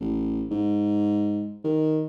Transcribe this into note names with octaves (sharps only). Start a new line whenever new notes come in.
A1
G#2
D#3